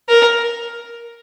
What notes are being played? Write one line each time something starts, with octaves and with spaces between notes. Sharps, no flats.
A#4